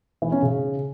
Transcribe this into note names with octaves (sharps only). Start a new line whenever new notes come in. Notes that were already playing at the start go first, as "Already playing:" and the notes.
E3
C#4
C#3